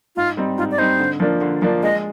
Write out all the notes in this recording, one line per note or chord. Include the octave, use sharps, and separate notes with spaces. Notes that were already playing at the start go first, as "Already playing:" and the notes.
G#2 F4
G3 C4 D#4
G#2 F4
D5
G3 C4 D#4 C5
D3
F3 A#3 D4
D3
F3 A#3 D4
G#3 D#5